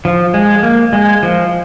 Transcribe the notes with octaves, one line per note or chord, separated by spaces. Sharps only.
F3
G#3
A#3
G#3
F3